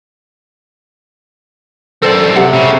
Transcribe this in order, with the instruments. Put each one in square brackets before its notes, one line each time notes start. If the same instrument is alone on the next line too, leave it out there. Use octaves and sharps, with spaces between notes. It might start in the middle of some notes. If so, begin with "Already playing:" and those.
[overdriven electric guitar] F#2 C4 [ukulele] A4 C5 D5
[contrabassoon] C3 [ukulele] F#5
[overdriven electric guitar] C#3